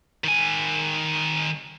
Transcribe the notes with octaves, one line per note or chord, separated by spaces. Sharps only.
D#3 G#5